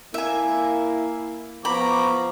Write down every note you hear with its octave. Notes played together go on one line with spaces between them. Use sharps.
A#3 E4 E5 G#5
F3 B3 A#5 B5 C#6 D6